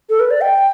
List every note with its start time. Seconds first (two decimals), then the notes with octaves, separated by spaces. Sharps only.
0.10 A4
0.20 B4
0.31 D5
0.41 G5